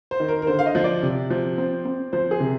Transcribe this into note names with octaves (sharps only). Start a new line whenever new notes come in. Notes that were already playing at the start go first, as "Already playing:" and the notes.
C5
D#3
A#4
A#4
D3 C5
F5
D#5
F3
D5
C3
F3
C4
C4
F3 C5
G#4
C3